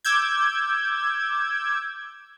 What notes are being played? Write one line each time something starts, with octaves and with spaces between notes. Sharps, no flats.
D6 E6 G6 G#6